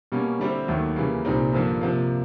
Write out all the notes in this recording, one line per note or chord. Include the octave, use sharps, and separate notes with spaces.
B2 G3 A#3 C#4
D3 G3 C4 E4 G4
D#2 D#3 F#3 A3
C#3 E3 G3 A#3
C2 A#2 G3 C4 D#4
G2 D3 F3 A#3
C3 F3 A#3